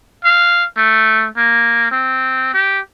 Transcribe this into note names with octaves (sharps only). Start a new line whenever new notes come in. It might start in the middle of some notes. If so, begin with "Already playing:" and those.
F5
A3
A#3
C4
G4